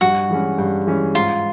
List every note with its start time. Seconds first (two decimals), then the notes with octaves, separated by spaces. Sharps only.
0.01 G2 F#4
0.30 E3 G#3 C#4
0.58 G2
0.87 E3 G#3 C#4
1.15 G#2 F4